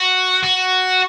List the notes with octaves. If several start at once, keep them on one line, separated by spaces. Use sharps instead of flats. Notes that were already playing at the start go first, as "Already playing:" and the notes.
Already playing: F#4
F#4